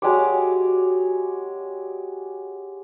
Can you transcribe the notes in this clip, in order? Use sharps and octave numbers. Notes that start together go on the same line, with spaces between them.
F#3 G#3 G4 D5